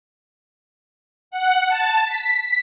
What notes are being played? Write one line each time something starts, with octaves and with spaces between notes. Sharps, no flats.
F#5
A5
B6